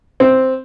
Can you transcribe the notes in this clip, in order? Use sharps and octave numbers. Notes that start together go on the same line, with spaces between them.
C4